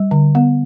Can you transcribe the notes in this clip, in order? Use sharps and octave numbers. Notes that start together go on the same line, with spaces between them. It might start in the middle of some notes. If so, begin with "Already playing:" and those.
Already playing: G3
D3
B3